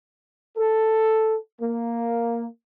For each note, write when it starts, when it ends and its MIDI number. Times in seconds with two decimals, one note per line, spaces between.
0.57 1.36 69
1.61 2.46 58